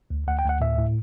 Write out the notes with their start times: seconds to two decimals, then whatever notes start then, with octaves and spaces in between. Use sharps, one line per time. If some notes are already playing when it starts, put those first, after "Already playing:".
0.10 D2
0.27 D2 F#5
0.39 G5
0.44 D2
0.49 F#5
0.60 A2 E5
0.77 A2